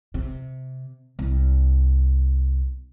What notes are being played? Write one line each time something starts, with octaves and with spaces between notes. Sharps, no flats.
C3
C2